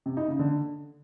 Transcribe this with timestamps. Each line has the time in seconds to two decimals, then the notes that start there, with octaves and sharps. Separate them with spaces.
0.06 C3
0.17 D#4
0.28 C#3
0.39 D3